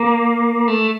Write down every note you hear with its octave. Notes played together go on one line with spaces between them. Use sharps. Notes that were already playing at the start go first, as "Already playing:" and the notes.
Already playing: A#3
A3